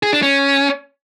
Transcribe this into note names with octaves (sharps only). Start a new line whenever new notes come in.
G#4
D4
C#4